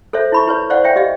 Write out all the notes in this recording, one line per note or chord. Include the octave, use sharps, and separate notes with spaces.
A4 C5 C#5 E5
E4 B5 C#6
E4 B4 C#5
C5 D5 F5 F#5
C#5 E5 G5 G#5
G4 D#5 F5